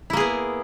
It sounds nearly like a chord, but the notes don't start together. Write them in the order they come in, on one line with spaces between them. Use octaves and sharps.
E4 A#3 G#4 B3